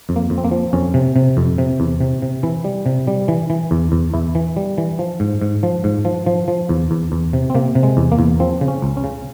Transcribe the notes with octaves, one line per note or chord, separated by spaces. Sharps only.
F2
A#3
F2
C4
A#3
F3
F2 C#4
C3
C3
F2
C3
E2
C3
C3
E3 E4
G3
C3
G3
E3
E3
E2
E2
E2 E4
E3
G3
E3
F3
G#2
G#2
F3
G#2
F3
F3
F3
E2
E2
E2
C3
C4
C3 A#3
C3
G#3
E2
A#3
E2
F3 C4
C#3
C#4
C#2
C#4
C#3